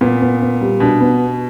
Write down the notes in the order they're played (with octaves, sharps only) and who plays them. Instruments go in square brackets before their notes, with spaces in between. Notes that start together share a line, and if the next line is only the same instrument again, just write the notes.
[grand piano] A#2 [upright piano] B3
[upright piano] B3
B3
G3
[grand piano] B2 [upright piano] D4
[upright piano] B3